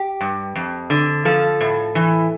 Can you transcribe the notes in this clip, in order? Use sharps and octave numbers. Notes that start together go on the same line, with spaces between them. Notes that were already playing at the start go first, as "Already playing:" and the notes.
Already playing: G4
G2
F2
D3
F3 A4
A2
E3